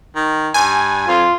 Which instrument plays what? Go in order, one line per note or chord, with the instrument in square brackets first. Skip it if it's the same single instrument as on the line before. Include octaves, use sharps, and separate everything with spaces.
[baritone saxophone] D#3
[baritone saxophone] G2 [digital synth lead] G#5
[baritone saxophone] F2 [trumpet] F4